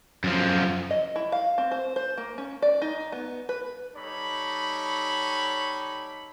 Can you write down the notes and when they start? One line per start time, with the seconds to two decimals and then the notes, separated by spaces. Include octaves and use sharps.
0.24 F#2 F3
0.91 D#5
1.16 E4
1.32 F5
1.58 C4
1.71 C5
1.96 C5
2.18 A#3
2.38 C#4
2.62 D5
2.82 D#4
3.12 B3
3.49 B4
3.95 G3 D#4 A4 C#5 B5